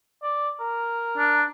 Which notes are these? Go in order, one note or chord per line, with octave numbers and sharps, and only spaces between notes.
D5
A#4
D4